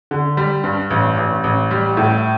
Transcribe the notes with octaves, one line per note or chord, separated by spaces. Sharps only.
D3
G3
G2
A1
A1
A1
G3
A2